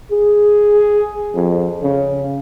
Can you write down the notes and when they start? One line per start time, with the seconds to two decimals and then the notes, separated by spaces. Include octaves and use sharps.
0.11 G#4
1.35 F2
1.83 C#3